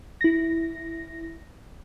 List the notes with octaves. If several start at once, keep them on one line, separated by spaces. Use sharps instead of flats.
E4 A#6